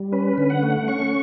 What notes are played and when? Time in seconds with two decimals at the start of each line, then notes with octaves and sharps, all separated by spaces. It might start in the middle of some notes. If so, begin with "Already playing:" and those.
Already playing: G3
0.12 C#4 B4
0.38 D3
0.50 F#5
0.63 A3
0.88 C#4 C#6